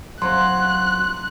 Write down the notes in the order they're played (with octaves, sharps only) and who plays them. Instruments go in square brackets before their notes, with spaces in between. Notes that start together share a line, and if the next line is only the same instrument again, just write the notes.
[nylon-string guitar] F#3 C5 F5 [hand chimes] C6 [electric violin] F#6